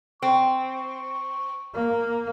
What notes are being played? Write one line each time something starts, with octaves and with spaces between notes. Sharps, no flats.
C4 C#6
A#3